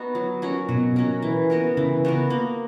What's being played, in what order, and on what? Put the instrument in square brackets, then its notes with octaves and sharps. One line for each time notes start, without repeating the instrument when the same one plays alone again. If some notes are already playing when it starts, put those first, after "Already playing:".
Already playing: [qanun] B3 D#4 F#4
F#3
C#4 F#4 A#4
[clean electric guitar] B2 [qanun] F#3
[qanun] C#4 F#4 A#4
E3
B3 F#4 A#4
[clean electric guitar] C#3 [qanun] E3
[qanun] B3 F#4 A#4
A#3